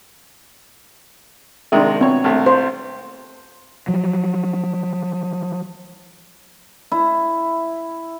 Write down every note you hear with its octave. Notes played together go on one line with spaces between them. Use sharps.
C2 D#3 G#3 D4 E5
B2 C4 C#5
C2 A3
C5
F3 F#3
E4